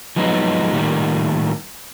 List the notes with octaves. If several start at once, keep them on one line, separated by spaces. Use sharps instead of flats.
F3 F#3 G#3 B3 D4 D#4
A2 D#3 G3 A#3